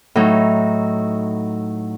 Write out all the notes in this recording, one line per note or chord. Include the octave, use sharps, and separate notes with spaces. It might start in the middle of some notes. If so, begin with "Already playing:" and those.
A2 F#3 D#4